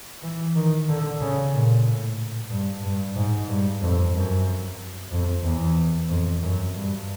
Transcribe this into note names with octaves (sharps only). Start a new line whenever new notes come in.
E3
D#3
D3
C#3
A#2
A2
G2
G2
G#2
G2
F2
F#2
F2
E2
F2
F#2
G2